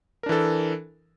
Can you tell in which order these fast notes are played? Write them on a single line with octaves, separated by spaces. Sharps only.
A#4 D4 E3 A4